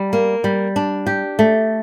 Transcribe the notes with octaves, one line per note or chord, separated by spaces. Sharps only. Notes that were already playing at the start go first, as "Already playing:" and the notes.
Already playing: G3
A#3
G3
D4
G4
A3